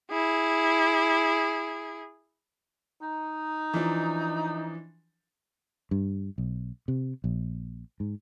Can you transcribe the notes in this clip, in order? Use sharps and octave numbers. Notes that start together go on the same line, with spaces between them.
E4 G#4
D#4
E3 F3 D4
G2
B1
C3
A#1
G#2